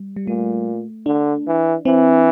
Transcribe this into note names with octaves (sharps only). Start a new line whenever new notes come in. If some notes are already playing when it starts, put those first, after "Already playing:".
Already playing: G3
G3
A#2 A3
D3 D4
E3
E3 C4